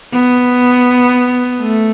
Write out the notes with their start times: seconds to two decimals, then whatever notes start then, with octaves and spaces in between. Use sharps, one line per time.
0.13 B3
1.61 A3